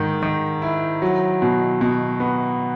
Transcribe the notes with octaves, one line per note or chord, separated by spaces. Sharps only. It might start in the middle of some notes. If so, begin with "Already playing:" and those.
Already playing: G#2 D#3
D#3
E4
F#3
B2
B2
B3